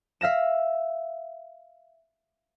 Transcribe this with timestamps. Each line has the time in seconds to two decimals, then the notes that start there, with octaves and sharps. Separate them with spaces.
0.21 E5 F5 A#6 E7